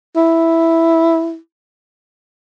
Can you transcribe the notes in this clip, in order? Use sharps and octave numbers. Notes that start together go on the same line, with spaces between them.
E4